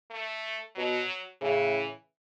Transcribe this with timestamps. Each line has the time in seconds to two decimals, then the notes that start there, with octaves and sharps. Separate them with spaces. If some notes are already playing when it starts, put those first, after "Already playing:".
0.11 A3
0.75 B2 F#3
1.41 A2 C#3 E3